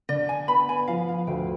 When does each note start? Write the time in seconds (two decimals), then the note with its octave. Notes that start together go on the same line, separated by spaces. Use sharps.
0.09 D3 D5
0.29 G#5
0.48 B3 B5
0.69 G#5
0.88 F3 F5
1.09 F5
1.27 D2 G5